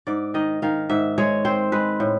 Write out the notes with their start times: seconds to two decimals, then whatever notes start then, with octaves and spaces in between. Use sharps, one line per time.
0.07 G#2 D5
0.34 D#3 D#5
0.62 D#3 F5
0.90 G#2 E5
1.18 G#3 C#5
1.45 C4 C5
1.72 G#3 B4
2.00 A2